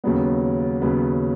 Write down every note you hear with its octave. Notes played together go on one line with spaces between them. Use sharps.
D#2 C#3 F#3 B3
D#2 C#3 F#3 B3